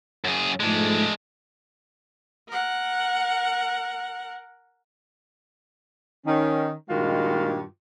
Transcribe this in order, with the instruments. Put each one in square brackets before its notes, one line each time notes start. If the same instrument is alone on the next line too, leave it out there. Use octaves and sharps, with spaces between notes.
[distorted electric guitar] F#2 G#4
[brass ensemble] G#2 F3 A3 [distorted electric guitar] G#3 D4
[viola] A#4 F#5
[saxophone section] D#3 C#4
G2 A#2 D#3 G#3 F4 F#4